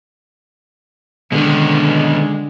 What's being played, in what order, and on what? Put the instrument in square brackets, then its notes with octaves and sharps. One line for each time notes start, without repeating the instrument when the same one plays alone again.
[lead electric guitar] B2 D#3 [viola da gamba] D3 [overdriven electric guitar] G#3